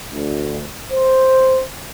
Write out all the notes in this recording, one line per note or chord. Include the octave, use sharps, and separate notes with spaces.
D2
C5